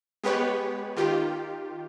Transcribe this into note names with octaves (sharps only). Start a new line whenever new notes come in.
G#3 B3 G4 B4 C#5
D#3 F4 G4